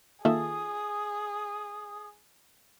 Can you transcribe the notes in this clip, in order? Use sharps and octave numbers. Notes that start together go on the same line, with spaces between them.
D#3 A#3 F4 G#4 A4 E5 D#6